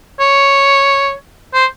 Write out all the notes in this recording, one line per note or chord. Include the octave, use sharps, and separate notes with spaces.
C#5
C5